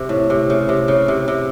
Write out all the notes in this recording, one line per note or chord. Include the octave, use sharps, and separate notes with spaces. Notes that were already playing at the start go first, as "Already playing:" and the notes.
Already playing: C3
A2
C3
C#3
C3
C#3
C3
C3